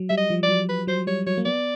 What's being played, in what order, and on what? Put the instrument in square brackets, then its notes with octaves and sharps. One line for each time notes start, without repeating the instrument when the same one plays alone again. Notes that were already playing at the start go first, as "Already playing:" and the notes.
Already playing: [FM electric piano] F#3
[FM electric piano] G3 [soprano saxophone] E5
[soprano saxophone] D#5
[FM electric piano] F3
[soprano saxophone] D5
[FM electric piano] F#3
[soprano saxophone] B4
[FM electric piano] F#3 [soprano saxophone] C5
[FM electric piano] G3 [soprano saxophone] C#5
[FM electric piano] F#3 [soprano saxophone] C#5
[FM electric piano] A#3
[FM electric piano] B3 [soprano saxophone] D5